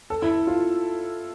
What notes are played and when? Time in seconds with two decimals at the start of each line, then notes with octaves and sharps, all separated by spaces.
0.10 A4
0.22 E4
0.47 F4